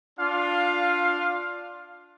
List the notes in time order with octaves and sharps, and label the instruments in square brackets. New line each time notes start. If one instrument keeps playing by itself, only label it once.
[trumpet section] D4 F4 F5